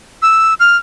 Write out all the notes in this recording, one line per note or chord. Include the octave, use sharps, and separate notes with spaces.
E6
F6